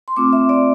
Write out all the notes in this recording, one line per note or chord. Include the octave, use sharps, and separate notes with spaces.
C6
A3 C4 F4 D6
E5
D5